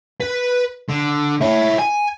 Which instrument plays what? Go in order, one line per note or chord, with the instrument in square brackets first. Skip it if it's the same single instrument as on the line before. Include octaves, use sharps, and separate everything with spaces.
[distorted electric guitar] B4
D3
E4 C#5
G#5